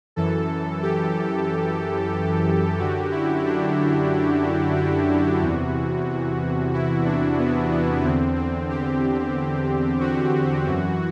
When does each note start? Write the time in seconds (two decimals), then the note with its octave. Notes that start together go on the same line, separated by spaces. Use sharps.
0.16 F#2 E3 A4
0.82 G4
2.78 F#2 D3 F#4
3.11 E4
3.44 D4
4.76 F#4
5.42 E2 C3 E3
6.73 E4
7.05 D4
7.38 B3
7.70 B3
8.04 E2 D3 C4
8.36 C4
8.70 G4
10.00 F#4
10.66 F#2 E3